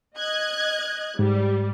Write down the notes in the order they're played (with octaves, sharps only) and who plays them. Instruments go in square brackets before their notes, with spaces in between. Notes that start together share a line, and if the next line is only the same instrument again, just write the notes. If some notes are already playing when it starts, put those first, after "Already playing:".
[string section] D#5 F#6 G#6
[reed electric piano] G#2 [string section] G3